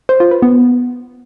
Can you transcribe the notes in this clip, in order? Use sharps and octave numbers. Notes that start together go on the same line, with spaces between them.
C5
F4
B4
B3